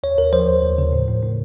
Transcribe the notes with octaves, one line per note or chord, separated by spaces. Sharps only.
D#2 C#5
D#2 A#4
F3 C5
D#2
D#2
C#3
A2
A2
A2